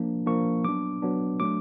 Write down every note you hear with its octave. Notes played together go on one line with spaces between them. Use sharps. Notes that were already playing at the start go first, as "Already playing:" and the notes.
Already playing: F3 A#3 D4
F3 A#3 D4 C#6
F#3 B3 D4 D6
F#3 B3 D4
F#3 A3 D4 D6